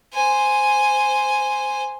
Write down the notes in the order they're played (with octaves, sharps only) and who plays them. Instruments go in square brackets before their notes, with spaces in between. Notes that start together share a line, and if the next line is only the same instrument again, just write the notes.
[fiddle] C5 G#5